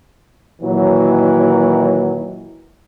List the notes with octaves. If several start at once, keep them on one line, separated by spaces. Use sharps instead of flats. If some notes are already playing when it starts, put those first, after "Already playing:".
A#2 D#3 E3 F#3